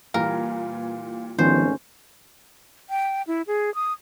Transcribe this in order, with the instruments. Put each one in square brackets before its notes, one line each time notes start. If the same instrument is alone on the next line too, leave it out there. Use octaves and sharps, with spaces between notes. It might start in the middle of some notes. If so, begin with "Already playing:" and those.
[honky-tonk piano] A#2 E3 G3 [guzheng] A#4 [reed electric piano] F5
[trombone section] G#1 D2 C#4 [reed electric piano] D#3 F3 B3 [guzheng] C5
[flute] G5
E4
G#4
D#6